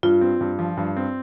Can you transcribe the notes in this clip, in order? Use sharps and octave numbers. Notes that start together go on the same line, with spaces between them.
G2 F4
C4
G2
F3
G2
C4